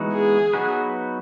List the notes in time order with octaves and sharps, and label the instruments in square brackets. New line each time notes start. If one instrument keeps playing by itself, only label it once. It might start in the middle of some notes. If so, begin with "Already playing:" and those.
Already playing: [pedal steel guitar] E3 G#3 B3 D#4 F#4
[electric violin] G#4
[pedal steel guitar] F#3 B3 D#4 F#4 B4